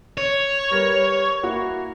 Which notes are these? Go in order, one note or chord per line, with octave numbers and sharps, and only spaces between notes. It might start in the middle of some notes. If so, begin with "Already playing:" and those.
C#5
G3 A#4 B4
A#3 E4 F#4